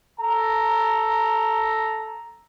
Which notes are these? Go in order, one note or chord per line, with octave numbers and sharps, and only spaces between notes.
A4 A#5